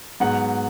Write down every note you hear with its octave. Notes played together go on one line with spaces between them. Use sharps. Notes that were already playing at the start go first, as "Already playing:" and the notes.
G#2 F#3 B3 F#5